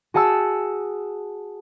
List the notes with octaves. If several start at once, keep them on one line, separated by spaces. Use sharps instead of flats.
F#4 G#4 F#5 A5 E6